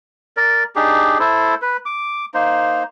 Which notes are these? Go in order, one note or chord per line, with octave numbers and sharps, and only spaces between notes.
A#4 D5
D4 D#4 G4 G#4
E4 A4 C5
B4
D6
A#3 D#4 C5